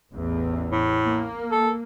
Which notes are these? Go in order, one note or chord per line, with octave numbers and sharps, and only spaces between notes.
A1 E2
A2
A#3
A4